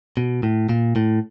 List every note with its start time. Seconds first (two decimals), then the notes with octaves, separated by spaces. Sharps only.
0.17 B2
0.43 A2
0.69 A#2
0.96 A2